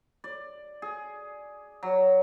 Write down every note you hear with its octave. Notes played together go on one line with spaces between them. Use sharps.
D5
G#4
F#3